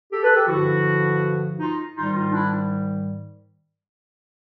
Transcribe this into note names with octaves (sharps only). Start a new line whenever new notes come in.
G4 A4
A4 B4
G4 A4
G2 D3 F3 E4 F#4
D#4 F4
G#2 D#3 G3 D#4 F4
D#4 F4
D4 E4